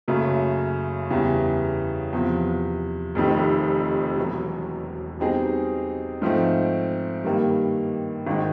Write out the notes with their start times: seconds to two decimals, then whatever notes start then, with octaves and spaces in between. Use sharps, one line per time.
0.08 F#1 F#2 C#3 F#3 A3
1.10 E2 C#3 E3 G3
2.13 E2 C3 F3
3.15 F1 F2 C3 D#3
4.17 E1 E2 B2 F#3
5.20 B2 G3 C4 D#4 G#4
6.22 G#2 F3 A3 C4
7.24 G2 D#3 G3 A#3
8.27 G#1 D#3 G#3